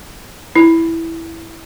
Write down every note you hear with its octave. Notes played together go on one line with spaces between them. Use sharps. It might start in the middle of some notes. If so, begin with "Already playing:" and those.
E4